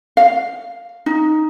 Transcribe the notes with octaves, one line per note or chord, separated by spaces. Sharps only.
F5
D#4